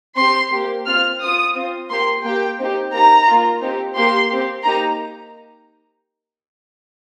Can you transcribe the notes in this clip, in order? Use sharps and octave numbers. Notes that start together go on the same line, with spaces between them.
C4 G4 C6
A#3 G4
C4 F4 F6
C4 F4 D#6
C4 F4
A#3 G4 C6
A#3 G4 G5
C4 D#4 G4
A#3 D#4 G4 A#5
A#3 F4
C4 D#4 G4
A#3 G4 C6
C4 G4
A#3 D#4 G4 A#5